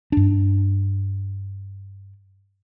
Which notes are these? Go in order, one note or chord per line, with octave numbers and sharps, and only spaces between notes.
G2 D4